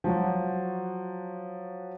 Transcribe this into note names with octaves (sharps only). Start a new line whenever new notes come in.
F3 F#3 F#4